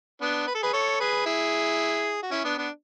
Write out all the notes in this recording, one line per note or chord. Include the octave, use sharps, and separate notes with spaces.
B3 D4
B4
A4
G#4 B4
A4 C#5
G#4 B4
E4 G#4
F#4
C#4 E4
B3 D4
B3 D4